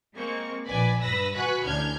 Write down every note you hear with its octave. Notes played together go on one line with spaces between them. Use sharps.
G#3 A#3 C4 C#6
A#1 B4 D5 G#5
G2 B4 E6 A#6
F#4 B4 G#5 B5 C#6 F#6
A1 D2 D4 F6 G6 G#6